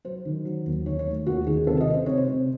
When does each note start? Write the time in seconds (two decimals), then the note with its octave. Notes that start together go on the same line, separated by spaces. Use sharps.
0.05 F#3 C5
0.25 D#3
0.45 F#3
0.66 D#2
0.86 D#3 C#5
0.99 C#5
1.06 A3
1.26 D#2 F#4
1.47 D#3 G#4
1.67 C3 A4
1.80 D#5
1.87 C3
1.94 C5
2.06 C3 C#5
2.17 C5
2.28 C3